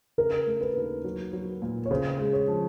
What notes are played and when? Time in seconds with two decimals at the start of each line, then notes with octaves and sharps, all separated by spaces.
0.18 C#3 A#4
0.47 A3
0.61 B4
0.76 D#2
1.04 F#3
1.33 F#3
1.62 A#2
1.86 C#5
1.90 C#3 C5
2.19 G#3
2.33 C#5
2.48 F3